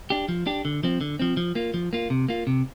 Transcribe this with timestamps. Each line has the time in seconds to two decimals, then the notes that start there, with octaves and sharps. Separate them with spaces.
0.10 D4 G4
0.28 F3
0.46 D4 G4
0.65 D3
0.84 F3 C4
1.01 D3
1.19 F3 C4
1.37 F3
1.55 A#3 F4
1.74 F3
1.93 A#3 F4
2.10 C3
2.29 A#3 F4
2.47 C3